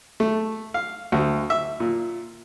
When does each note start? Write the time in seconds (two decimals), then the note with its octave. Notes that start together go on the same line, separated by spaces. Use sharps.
0.20 A3
0.74 F5
1.12 D2
1.50 E5
1.80 A#2